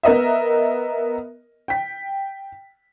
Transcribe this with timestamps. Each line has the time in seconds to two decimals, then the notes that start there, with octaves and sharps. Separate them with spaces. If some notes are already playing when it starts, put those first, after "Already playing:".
0.03 B3 A#4 D#5 E5
1.68 G5 B6